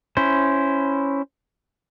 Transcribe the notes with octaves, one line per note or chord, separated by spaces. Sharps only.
C#4 E4 C5